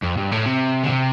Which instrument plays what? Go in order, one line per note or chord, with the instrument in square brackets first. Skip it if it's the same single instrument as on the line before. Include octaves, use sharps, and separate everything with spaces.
[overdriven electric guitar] F2
G2
A2
C3
D3
C3